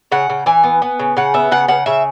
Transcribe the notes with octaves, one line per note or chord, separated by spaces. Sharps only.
C#3 F#5
C#3
E3 G#5
B3
B3
C#3
C#3 F#5
B3 E5
C#3 F#5
C#3 F#5
C#3 E5